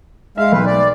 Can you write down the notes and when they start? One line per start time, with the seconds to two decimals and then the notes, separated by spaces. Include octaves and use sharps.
0.38 G#3 E5 F5
0.52 B1 B4
0.66 D5